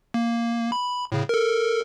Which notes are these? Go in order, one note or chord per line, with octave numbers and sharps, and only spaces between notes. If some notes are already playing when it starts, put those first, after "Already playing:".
A#3
B5
A2 C#3
A4 A#4